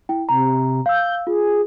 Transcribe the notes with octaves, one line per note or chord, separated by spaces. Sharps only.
E4 G5
C3 A#5
F5 E6 G6
F4 G#4